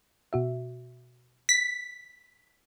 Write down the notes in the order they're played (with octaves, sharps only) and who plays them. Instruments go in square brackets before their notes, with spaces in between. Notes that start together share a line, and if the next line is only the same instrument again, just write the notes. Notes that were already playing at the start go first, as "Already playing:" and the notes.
[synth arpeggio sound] B2 F#4 E5
[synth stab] B6